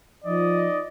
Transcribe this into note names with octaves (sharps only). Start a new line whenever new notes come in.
F3 D#4 D5 D#5